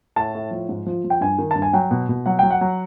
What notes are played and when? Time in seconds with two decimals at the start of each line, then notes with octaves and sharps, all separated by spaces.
0.16 A2 A5
0.35 A2
0.51 F3
0.69 G#2
0.86 F3
1.04 F3
1.10 G5
1.21 G2 G#5
1.39 D#3
1.51 G2 A5
1.62 G#5
1.73 F#3 G5
1.91 B2
2.09 B2
2.26 F#3 F#5
2.39 F#3 G5
2.50 F#5
2.61 F#3